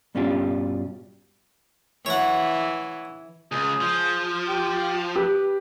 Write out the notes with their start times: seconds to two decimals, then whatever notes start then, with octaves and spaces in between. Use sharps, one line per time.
0.15 G2 B2 C#4 D4 F4 G4
2.06 E3 C#5 F#5
3.52 C#2 G#4
3.81 F3
4.48 G4
5.16 G4 B4